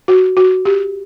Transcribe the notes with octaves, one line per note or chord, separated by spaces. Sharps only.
F#4
F#4
G4